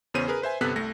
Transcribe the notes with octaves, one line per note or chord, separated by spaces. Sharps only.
E2 C#3 B3 C#4 C5 D#7
G#4 A#4 B4
B4 C5 E5 G#5
G1 C3 B3 A4 F#6 B6
C2 A3 A#6